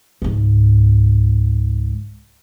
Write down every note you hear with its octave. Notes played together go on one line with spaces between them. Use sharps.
C#2 G#2